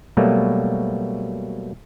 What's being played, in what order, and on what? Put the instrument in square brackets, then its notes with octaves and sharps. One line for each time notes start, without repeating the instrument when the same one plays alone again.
[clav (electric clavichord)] B2 F#3 G3 A3 A#3